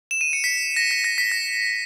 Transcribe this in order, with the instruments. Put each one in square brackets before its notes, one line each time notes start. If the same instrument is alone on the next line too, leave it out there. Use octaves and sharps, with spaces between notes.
[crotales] E7
D#7
C#7
B6
A#6
B6
A#6
B6
A#6